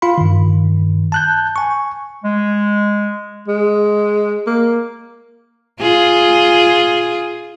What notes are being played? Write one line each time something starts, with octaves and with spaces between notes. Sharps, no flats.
F4 F5 B5 C6
G2 D#3
A5 F#6 G6
G#5 C#6
G#3
G#3
A#3
F4 G#4